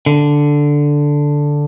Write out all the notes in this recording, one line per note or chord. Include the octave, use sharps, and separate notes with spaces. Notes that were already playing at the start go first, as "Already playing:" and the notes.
D3